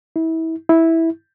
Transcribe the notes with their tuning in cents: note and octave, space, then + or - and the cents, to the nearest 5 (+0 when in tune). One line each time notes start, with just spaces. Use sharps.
E4 -30
E4 -10